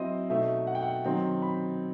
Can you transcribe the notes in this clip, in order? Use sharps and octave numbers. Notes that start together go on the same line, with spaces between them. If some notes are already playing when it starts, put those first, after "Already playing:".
Already playing: F#3 C4 E4 C5 D#5
B2 A3 D#4 E5
F#5
G5
F#5
D#3 F#3 C4 D#4 G5
B5